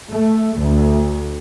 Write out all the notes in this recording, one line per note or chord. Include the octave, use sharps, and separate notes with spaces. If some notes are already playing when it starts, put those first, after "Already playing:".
A3
D2